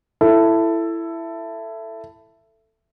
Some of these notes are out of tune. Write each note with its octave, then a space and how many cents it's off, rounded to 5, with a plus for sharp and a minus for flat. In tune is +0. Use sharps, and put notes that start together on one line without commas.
E4 +15 A4 +10